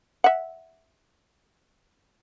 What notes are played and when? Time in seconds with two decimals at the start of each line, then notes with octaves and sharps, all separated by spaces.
0.24 E5 F#5